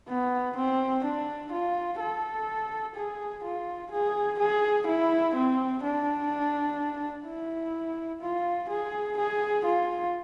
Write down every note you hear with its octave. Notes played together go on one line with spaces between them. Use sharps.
B3
C4
D4
F4
A4
G#4
F4
G#4
G#4
E4
C4
D4
E4
F4
G#4
G#4
F4